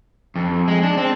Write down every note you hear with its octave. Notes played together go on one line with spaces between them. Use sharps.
F2
G#3
D4
C4